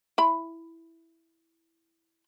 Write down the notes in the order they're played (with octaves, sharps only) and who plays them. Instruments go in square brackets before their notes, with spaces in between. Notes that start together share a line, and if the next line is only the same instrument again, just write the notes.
[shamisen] E4 B5